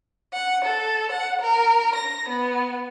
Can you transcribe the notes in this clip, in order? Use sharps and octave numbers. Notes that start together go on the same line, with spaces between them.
F#5
A4
F#5
A#4
A#6
B3